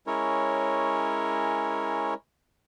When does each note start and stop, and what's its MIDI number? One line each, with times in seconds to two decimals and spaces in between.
0.07 2.14 56
0.07 2.14 61
0.07 2.14 64
0.07 2.14 70
0.07 2.14 73